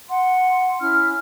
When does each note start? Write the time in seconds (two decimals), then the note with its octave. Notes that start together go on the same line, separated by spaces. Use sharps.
0.09 F#5 C6
0.79 C#4 E4 F6